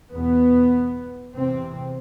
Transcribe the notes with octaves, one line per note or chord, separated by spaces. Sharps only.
E2 B2 B3
E2 C3 C4